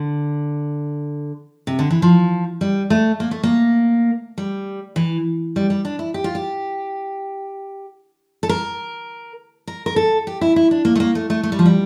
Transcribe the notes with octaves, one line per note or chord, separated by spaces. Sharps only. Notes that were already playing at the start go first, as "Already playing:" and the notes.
Already playing: D3
C3
D3
E3
F3
G3
A3
A#3
A3
A#3
G3
E3
G3
G3
D4
E4
G4
F4
G4
A4
A#4
A#4
A#4
A4
G4
E4
E4
D4
A#3
A3
A#3
A3
A3
A3
G3
F3
G3